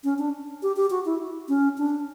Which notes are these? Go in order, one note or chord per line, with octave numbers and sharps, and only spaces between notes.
C#4
D4
G4
G4
F#4
E4
C#4
D4